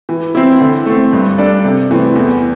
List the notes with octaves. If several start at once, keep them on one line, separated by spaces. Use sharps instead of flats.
E3
C4 E4
D3
A3 C4
G2
G3 D4 A4 D5
C3
E3 A3 C4
E2